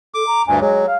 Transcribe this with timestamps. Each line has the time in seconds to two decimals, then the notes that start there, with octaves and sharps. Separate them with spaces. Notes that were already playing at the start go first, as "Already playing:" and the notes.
0.14 A4 D6
0.26 A#5
0.47 D2 G2 G#5
0.61 F#3 G#3
0.86 F5